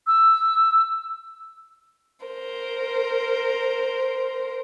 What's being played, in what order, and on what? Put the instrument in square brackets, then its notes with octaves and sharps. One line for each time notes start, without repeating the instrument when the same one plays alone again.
[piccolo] E6
[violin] A#4 C5